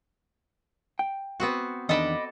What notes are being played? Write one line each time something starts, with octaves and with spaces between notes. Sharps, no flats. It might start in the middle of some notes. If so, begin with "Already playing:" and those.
G5
B3 C4 F#4
E2 D#3 D4 A4 D#5 A5 B5 D6